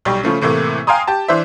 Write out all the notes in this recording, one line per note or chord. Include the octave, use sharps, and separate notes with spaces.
B1 G3 G4 C#6
C#3 F3 A3 C#4
A2 C3 E3 A3 A#3
F5 G5 G#5 A#5 C6 D#6
G4 A5
E3 D4 C5 E5